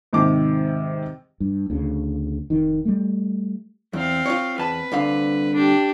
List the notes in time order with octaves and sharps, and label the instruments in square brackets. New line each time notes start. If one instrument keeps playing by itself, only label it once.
[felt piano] G#2 C3 D#3 D6
[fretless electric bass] G2
D2 C#3
F1 D#3
G3 A3
[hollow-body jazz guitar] E2 [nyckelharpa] C4 F5
[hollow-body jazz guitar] F4 C#5
[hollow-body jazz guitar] E2 A5 [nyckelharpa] B4
[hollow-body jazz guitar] C2 D3 F5
[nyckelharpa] D4 G4